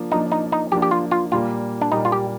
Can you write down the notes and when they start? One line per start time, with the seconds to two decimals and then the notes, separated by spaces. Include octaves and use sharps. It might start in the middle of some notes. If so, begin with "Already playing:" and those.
Already playing: F3 A#3 D4
0.12 F3 A#3 D4 D#4
0.32 D#4
0.52 D#4
0.72 F3 A#3 D4 G4
0.82 G4
0.91 F4
1.11 F4
1.32 A#2 G3 A#3 F4
1.81 D4
1.91 A#2 G3 A#3 D#4
2.05 F4
2.12 G4